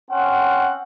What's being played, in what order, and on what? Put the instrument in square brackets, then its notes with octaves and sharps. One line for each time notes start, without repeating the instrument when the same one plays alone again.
[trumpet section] C4 C#4 F#5